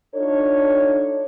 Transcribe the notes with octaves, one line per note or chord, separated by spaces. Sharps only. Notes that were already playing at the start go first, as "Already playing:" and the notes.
D4 D#4 F4 A4 C#5